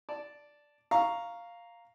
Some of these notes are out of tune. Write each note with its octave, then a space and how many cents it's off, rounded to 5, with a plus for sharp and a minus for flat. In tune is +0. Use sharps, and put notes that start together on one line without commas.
D5 -5 A5 +0
F5 +0 A#5 +0 C#6 +5